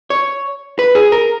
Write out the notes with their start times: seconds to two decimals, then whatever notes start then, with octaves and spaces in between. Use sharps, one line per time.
0.10 C#5
0.79 B4
0.95 G#4
1.12 A#4